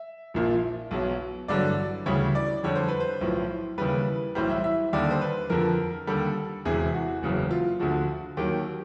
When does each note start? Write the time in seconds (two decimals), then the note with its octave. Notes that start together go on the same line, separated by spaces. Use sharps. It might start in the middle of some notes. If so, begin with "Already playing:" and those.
Already playing: E5
0.34 A#1 A#2 F3
0.91 B1 B2 F#3
1.48 A1 G2 D3 F#3 D5
2.06 D2 C#3 E3 G3 C#5
2.35 D5
2.64 F2 D3 G3 C#5
2.75 C5
2.88 B4
3.00 C5
3.21 B1 A2 F3
3.78 D#2 C#3 E3 G3 B4
4.35 B1 A2 E3 G3 C5
4.50 E5
4.64 E5
4.93 D#2 D3 G3 D5
5.11 C5
5.21 B4
5.50 F2 D3 F3 A#4
6.07 D#2 D3 G3 A4
6.65 E1 E2 C3 E3 G#4
6.94 F#4
7.22 F#1 E2 C#3 F#3
7.51 F4
7.80 D2 D3 F3 F#4
8.37 D#2 D#3 F#3 G4